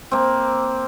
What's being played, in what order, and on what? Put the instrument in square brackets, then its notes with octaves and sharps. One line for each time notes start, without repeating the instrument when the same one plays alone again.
[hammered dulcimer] A#3 C4